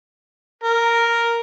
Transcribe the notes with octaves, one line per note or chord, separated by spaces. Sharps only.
A#4